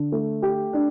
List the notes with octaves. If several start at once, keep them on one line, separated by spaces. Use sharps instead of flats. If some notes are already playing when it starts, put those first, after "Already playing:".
Already playing: D3
A3
G4
D4